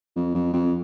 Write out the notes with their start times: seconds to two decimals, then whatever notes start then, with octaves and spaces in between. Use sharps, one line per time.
0.16 F2
0.35 F2
0.53 F2